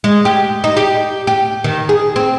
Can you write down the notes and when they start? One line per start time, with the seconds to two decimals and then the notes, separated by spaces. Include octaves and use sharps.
0.04 G#3
0.25 G4
0.64 D#4
0.77 G4
1.27 G4
1.64 D#3
1.89 G#4
2.16 C4